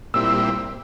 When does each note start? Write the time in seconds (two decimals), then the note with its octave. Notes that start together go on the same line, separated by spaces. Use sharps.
0.14 A#2 G3 C4 E4 E6
0.27 E6